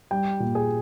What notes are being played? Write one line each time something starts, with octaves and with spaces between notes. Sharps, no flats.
G3 G5
A#2
G#4